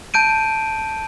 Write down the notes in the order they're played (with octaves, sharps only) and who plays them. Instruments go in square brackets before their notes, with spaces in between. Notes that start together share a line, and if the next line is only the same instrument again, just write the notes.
[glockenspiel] A5 G6 D7 D#7